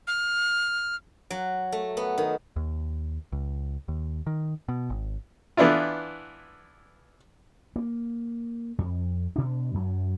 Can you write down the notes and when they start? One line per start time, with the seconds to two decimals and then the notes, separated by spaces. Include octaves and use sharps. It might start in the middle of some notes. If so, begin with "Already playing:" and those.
0.08 F6
1.30 F#3
1.72 A3
1.97 B3
2.18 D#3
2.56 D#2
3.32 C#2
3.88 D#2
4.27 D#3
4.69 B2
4.90 G#1
5.57 E3 B3 D4 E4 F4
7.76 A#3
8.78 F2
9.36 B2 D4
9.74 F#2 F#3